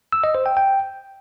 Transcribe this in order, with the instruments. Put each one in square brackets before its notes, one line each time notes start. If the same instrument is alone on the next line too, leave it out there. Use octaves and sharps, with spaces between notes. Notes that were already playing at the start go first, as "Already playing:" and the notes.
[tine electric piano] E6
D#5
C5
G5
G5